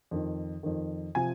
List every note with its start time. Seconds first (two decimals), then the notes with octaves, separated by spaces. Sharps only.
0.11 F2 D#3
0.63 F2 D#3
1.15 C3 F3 G#5